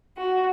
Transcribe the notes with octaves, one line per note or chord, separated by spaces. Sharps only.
F#4